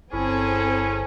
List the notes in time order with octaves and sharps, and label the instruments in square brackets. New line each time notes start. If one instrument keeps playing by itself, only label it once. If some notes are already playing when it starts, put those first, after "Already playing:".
[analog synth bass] G1 [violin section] C4 G#4 A4 [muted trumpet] C#4 [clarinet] E4